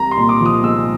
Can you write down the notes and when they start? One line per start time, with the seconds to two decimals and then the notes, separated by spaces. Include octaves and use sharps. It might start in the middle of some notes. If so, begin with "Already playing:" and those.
Already playing: C2 A#5
0.11 C6
0.17 A#2
0.29 D6
0.41 F3 D#6
0.63 G#3 E6